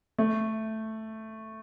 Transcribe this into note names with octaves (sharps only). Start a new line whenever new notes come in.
A3